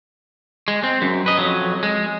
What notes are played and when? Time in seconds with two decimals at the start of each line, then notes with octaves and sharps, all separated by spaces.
0.68 G#3
0.84 C4
1.02 F#2
1.26 B4 D#5
1.37 F2 F#3
1.83 G#3